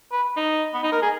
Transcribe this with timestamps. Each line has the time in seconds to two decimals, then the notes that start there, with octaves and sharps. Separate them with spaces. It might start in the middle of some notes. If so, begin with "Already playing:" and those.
0.12 B4
0.37 D#4
0.74 B3
0.83 D#4
0.92 A#4
1.02 G#4